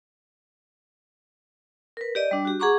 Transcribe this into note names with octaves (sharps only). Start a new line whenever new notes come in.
A#4 B4
G4 D5 D#5
G3 D4
F#4 G4
G#4 F#5 A#5 C#6 D6